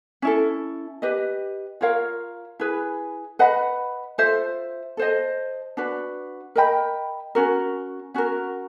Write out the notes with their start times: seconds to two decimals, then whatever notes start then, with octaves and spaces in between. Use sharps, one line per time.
0.22 C#4 E4 A4
1.02 G4 B4 D#5
1.81 F4 A#4 C#5 F5
2.60 E4 G#4 B4
3.39 B4 D#5 F#5 B5
4.18 F4 A4 C5 E5
4.97 A4 C5 D#5
5.77 D4 F#4 B4
6.55 A#4 D#5 G5 B5
7.35 C#4 F#4 A#4
8.14 C#4 F#4 A#4